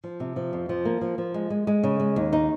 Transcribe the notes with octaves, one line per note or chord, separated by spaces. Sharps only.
F3
C3
F3
F2
F3
A#3
F3
F3
G#3
G#3
G#3
C#3
G#3
D#2
D#4